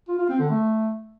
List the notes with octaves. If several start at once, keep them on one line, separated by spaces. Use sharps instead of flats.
F4
F4
C4
D3
A3